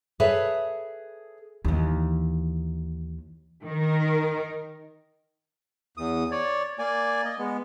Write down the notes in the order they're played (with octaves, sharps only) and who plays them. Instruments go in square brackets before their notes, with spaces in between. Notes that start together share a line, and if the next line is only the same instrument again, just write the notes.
[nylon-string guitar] G#4 A4 B4 C#5 E5
[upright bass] D#2 E3
[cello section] D#3 A#4
[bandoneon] E2 D#6
C#5 D5
A#3 D5 G#5
D#5
G#3 B3